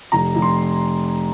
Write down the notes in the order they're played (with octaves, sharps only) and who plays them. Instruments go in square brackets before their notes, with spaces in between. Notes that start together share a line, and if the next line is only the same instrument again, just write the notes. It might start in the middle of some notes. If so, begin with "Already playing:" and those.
[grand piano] F1 A#5
F1
C6